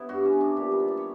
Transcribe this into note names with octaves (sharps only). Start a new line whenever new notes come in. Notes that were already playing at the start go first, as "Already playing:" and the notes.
Already playing: B3 E4 C#5
G2 F#4
C#4
B3
D4
A#2 G4
B4
B3
D5
C#5